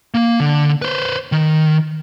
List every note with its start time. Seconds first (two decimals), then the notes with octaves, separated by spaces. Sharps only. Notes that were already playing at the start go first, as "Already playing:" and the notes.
0.14 A#3
0.40 D3
0.82 B4 C5
1.32 D#3